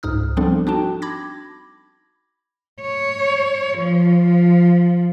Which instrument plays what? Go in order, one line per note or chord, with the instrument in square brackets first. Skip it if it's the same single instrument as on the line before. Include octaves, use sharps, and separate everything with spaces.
[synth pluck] C#2 G#2 D#4 D#6 F6
F3 G3 B3 C4 D4 A4
D4 D#4 F#4 G5 A5
B5 D6 G#6 A#6
[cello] C#5
F3